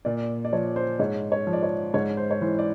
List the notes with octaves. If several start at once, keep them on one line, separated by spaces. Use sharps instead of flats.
A#2 D5
D5
F3 C#5
C5
G#2 C#5
C#5
F3
D5
C#5
G#2 C#5
C5
C#5
E3 C5
D5